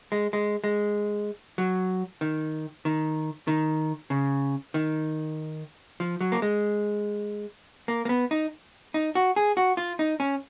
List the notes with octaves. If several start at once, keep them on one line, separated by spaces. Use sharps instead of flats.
G#3
G#3
G#3
F#3
D#3
D#3
D#3
C#3
D#3
F3
F#3
A#3
G#3
A#3
A#3
B3
D#4
D#4
F#4
G#4
F#4
F4
D#4
C#4